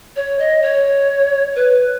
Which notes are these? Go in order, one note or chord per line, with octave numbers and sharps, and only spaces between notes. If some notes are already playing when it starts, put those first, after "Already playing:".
C#5
D#5
C#5
B4